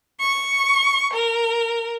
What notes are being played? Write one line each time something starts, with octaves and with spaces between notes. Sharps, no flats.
C#6
A#4